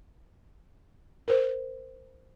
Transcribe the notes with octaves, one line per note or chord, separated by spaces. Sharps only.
A#4 C5